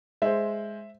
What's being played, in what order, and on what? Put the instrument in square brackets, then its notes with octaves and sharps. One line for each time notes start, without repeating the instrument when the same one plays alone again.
[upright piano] G#3 C5 [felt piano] E5